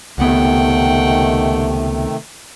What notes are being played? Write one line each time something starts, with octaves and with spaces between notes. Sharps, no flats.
C#2 C3 D#3 A3 B3 F#5 G5